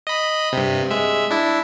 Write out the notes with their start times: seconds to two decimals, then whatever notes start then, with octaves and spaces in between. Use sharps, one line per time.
0.07 D#5 B5
0.53 G2 C3
0.90 G#3 E5
1.30 D4 E4